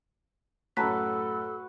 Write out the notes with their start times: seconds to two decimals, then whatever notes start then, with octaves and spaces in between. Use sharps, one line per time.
0.77 F#2 A2 F#4 A4 B4 A5 A#5 B6